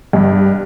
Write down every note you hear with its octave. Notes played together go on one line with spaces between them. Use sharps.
G2